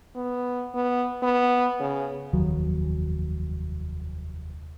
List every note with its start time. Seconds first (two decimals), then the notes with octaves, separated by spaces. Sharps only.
0.16 B3
0.74 B3
1.22 B3
1.80 C#3
2.33 F1 D#2 F#3